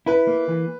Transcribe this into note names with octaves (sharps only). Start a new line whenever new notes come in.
E4 B4
A#3
E3